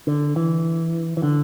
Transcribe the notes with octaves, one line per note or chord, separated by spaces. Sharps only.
D3
E3
E3
D3